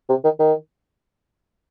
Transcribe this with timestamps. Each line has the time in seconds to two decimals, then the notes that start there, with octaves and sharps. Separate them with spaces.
0.09 C3
0.24 D#3
0.39 D#3